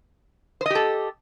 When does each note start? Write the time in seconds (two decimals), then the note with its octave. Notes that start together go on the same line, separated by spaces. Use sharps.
0.61 C5
0.66 D#5
0.70 G4
0.75 A4